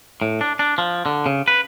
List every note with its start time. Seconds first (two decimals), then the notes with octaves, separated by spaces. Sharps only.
0.22 A2
0.41 D4
0.59 D4
0.78 F3
1.06 D3
1.26 C#3
1.48 B4